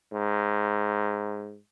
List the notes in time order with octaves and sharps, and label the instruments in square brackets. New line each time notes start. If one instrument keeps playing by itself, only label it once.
[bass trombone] G#2